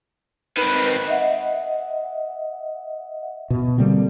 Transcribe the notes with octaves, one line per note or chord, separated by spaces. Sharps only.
D#3 C4 B4
D#5 E5 F#5
B2
D3 G3 A#3 C4